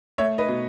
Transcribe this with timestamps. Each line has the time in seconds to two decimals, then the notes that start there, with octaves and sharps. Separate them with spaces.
0.18 A3 C#5 E5
0.38 B4 D#5
0.48 B2